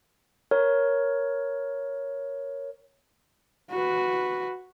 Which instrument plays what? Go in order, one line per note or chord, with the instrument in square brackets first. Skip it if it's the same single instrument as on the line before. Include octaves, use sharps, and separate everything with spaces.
[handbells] A#4 C#5
[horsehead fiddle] F#4 B4